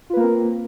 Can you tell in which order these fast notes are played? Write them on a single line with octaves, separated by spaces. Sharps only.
F4 B4 A#3 A#4 C4